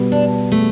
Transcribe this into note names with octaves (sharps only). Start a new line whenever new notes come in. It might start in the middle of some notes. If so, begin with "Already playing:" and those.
Already playing: B2 G3 B3
D4
A3